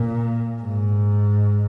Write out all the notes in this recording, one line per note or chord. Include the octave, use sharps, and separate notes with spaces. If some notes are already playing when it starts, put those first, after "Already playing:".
Already playing: A#2
G#2